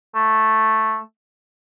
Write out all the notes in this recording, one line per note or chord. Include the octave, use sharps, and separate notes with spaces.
A3